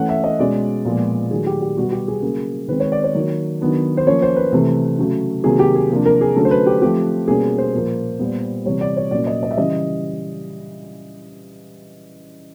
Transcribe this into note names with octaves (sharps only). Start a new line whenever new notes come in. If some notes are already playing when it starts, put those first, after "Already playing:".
Already playing: E3 A3 C#4 F#5
E5
D#5
B2 G#3 C#4 D5
A#2 F3 G#3 B3
D#3 F#3 A3 G#4
G4
G4
B2 G3 B3 F#4
G4
G#4
C#3 F#3 A#3
D#3 G#3 C4 B4
C#5
D5
C#5
D#3 F#3 A#3
D#3 F#3 B3 D4
C5
F3 A#3 C#4 C#5
C5
B4
C3 E3 A3
C#3 F#3 A3
C3 D#3 F#3 A#3 G#4
G4
G#4
C3 F3 A#3 D4
A#4
G#4
D3 F#3 A3 C#4 A4
C5
B4
G4
F3 A3 C4 G4
B2 G3 A#3 C#4 G#4
C5
A#2 F3 A#3
A#2 G3 B3
C3 E3 G3 C#5
D5
C#5
A#2 F#3 A#3 C#4 D5
D#5
D#5
E5
C#3 E3 G3 D#5